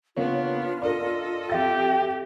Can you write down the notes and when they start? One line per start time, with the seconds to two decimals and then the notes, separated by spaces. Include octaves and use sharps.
0.17 C#3 A#3 B3 D4 F4 C#5
0.82 D4 A4 A#4 D#5
1.50 F2 G4 E5 A6